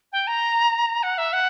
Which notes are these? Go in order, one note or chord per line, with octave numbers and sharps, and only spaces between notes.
G5
A#5
F#5
E5
F#5